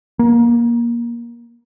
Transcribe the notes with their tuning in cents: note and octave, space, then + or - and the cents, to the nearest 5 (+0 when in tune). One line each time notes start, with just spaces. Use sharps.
A#3 +20